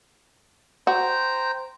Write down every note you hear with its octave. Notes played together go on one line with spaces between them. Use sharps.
F#4 C5 G5 A#5